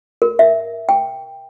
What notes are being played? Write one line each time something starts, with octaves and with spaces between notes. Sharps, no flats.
A#4
E5
G5